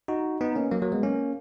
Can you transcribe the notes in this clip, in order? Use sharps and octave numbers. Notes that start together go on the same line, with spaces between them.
D#4 F#4
B3 D#4
A#3 C#4
F#3 A#3
F#3 A#3
G#3 B3
A#3 C#4